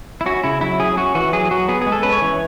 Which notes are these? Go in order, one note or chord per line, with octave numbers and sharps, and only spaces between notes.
E4
C#4 F#4
C#3 E4
F#3 E4
C#4 G#4
C#4 F#4
E3 F#4
F#3 G#4
F#3 F#4
B3 G#4
G#3 G#4
A4
C#4 B4
C#5
E3